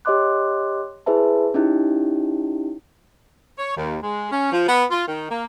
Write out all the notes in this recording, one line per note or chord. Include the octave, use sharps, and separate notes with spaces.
G4 C#5 D#5 C6 D6 F#6
E4 G#4 B4 C5 E5 A5
C#4 D#4 E4 G4
C#5
D#2
G#3
C#4
F3
B3
F4
D#3
A#3